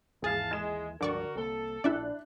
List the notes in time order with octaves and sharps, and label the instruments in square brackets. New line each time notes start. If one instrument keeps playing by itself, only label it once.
[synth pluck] G#1 G#4 [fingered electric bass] D#2 E3 [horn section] F5 A5
[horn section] G#3 [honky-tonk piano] G#6 E7
[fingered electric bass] C#2 G2 F3 [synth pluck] D3 D5 C#6 [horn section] F#4 A#4
[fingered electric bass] C2 A#3 [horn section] A4
[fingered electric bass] A#1 [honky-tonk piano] D4 E4 F#6 [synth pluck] D5 E5